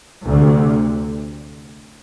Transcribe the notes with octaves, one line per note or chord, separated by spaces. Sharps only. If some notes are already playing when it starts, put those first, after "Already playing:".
D2 C3